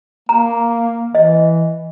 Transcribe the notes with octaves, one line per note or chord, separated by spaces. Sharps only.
A#3 A#5
E3 D#5